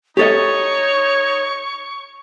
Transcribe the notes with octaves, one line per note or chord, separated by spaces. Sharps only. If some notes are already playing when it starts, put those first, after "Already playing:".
D#4 G4 A4 C#5 D#5 C#6